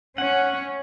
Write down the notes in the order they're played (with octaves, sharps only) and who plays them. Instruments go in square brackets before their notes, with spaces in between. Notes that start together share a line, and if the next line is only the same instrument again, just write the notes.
[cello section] C#4 [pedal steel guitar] F#5